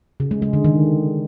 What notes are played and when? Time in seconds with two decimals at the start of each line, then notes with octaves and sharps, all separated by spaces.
0.20 C#3
0.31 G#3
0.42 G#3
0.53 D3
0.64 D#3